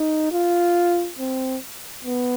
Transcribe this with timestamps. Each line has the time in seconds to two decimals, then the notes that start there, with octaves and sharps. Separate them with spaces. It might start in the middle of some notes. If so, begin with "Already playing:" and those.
Already playing: D#4
0.32 F4
1.19 C4
2.04 B3